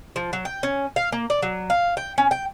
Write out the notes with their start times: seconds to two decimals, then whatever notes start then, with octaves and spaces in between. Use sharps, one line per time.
0.16 F3
0.33 F#3
0.45 G5
0.63 C#4
0.96 F5
1.12 A#3
1.30 D5
1.42 F#3
1.70 F5
1.97 G5
2.18 C#4
2.31 G5